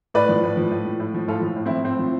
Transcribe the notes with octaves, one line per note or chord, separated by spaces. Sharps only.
A2 B4 D5
F3
A2
F3
A2
F3
A2
F3
A2 F4 A4
F3
A2
F3 C4 E4
A2 C4
F3